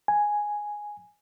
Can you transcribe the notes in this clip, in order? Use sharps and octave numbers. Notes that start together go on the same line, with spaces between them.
G#5